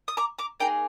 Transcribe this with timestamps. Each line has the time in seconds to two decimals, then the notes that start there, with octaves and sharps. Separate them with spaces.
0.08 D#6
0.17 A#5 D6
0.39 A#5 D6
0.60 A#3 D#4 G#4 G5 A#5